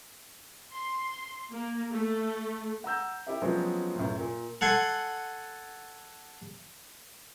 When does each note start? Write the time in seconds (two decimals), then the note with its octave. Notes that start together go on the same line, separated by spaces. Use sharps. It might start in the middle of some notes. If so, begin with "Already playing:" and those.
0.73 C6
1.52 A#3
1.92 A3
2.84 F#5 A#5 E6 G6
3.27 E4 G4 E5
3.41 C#3 F3 F#3 G#3 B3 C4
3.95 C#2 F#2 A2
4.18 A#2
4.61 A4 F#5 G#5 C6